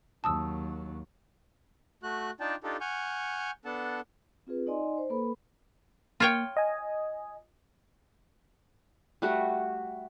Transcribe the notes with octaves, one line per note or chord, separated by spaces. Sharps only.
D#2 F#3 A5 D#6 E6
A3 F#4 F#6
D4 D#4 F4 D5 G5 A5
D4 D#4 F4 G4 A4
F#5 G#5 C#6 F6 G6
B3 D4 A4 F#5 A5
C4 F4 G#4 B4
D#4 D5 D#5 G#5 C6
C5
A#3 A4 B4 B5
A#3 F4 C#5 G5
D#5 G#5
G3 A3 F#4